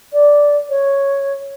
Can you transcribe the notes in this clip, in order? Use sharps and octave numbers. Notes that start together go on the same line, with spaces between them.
D5
C#5